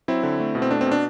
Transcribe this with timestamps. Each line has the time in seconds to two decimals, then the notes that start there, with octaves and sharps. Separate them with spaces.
0.08 F#3 C4 E4
0.23 D3
0.40 A3
0.55 B2
0.62 C4
0.71 A3 D4
0.81 C4
0.86 B2
0.91 D4